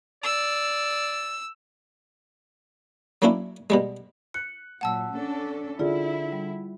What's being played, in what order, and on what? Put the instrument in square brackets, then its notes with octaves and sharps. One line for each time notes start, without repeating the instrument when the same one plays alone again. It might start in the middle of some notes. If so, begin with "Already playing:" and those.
[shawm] D5 [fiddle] E6
[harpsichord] F#3 A#3 C#4 D4 E4
B2 G3 G#3
[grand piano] F#6 [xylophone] C#7
[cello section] A#2 F#3 [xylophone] F#5 A5 E6
[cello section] C#4 D4 A4
[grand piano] D3 [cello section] E4 [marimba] F4 G#4 D5
[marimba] G3